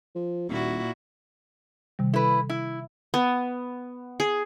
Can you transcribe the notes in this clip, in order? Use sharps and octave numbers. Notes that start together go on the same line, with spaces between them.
F3
D#1 A#2 E4 F#4
C3 D#3 G3
E4 A4 B4
E4
B3
G#4